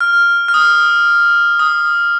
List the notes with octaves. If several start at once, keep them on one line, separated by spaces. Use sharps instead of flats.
F6
F6
D#6
D#6